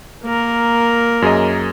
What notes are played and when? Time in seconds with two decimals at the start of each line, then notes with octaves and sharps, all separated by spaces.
0.23 A#3 A#4
1.22 F#2 G#4 D#5